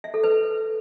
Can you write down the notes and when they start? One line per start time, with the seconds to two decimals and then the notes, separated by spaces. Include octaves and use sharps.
0.04 E5
0.14 A4
0.23 B4